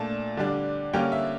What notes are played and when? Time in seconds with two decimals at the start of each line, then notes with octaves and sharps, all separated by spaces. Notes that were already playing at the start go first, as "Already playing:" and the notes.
Already playing: A#2 A3 D4 A5
0.37 D3 G3 D4
0.93 D3 G3 A#3 C#4 G5
1.12 E5